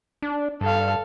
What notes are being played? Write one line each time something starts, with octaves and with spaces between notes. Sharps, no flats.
D4
G2 A4 F5